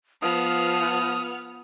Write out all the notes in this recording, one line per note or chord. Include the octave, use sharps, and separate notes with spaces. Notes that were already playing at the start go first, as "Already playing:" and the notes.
F3 B3 D#6 F6